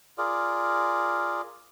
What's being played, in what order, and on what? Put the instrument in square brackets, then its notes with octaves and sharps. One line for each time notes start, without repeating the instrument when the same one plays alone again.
[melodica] F4 G#4 A#4 D5